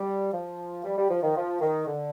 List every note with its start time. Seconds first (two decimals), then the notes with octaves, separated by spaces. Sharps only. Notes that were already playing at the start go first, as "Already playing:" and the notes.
Already playing: G3
0.33 F3
0.85 G3
0.98 G3
1.10 F3
1.23 D#3
1.36 F3
1.61 D#3
1.87 D3